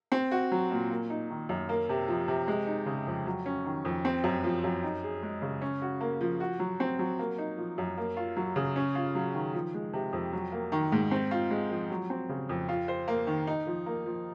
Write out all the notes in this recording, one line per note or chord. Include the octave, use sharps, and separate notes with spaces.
C4
F#4
F#3
A#2
A#3
D#4
D#3
F#2
A#3
C3
F3
C3
G#3
D#4
C#3
F2
F#3
C#4
D#3
F2
C4
F#2
F3
F#2
D#4
G#4
G#3
C#3
C#4
F#4
A#3
F3
F#4
F#3
C4
F#3
A#3
D#4
F3
F#2
A#3
F4
F#3
C#3
C#4
F4
F#3
D#3
F3
G#3
C3
F2
F#3
A#3
D#3
G#2
C4
F4
G#3
F3
F#3
C4
C#3
F2
F4
C5
A#3
D#3
D#4
F3
A#3
F3